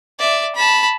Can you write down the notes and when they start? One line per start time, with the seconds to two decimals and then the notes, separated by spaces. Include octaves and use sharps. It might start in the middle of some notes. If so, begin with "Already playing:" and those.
0.19 D5 E5
0.55 A5 B5